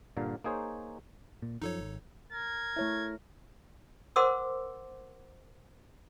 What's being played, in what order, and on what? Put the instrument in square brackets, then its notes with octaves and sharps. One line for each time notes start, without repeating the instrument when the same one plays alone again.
[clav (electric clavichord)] G2 A#2 D3 A#4 F5
A#3 D#4 G#4 C5 C#5
[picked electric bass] A#2
[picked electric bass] F#2 F3 [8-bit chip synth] D#4 A4 C#5
[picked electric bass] G#1
[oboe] A#4 [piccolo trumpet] G#6
[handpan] A3 C#5 E5 [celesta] E4
[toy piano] A#4 C5 F#5 C6 D6 E6